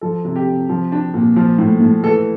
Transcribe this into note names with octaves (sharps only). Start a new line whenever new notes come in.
F3 A4
C3
G4
C3
F3
D4
A#2
F3
A2
A2
E3 A4